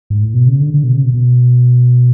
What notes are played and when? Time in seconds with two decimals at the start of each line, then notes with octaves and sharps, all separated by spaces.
0.10 G#2
0.23 A2
0.34 B2
0.47 C#3
0.60 D3
0.74 D3
0.84 B2
0.93 C#3
1.03 B2
1.14 B2